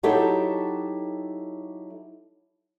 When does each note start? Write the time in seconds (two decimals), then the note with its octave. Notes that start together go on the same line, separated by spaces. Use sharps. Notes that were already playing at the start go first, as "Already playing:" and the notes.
0.03 F#3 D#4 E4 G4 A4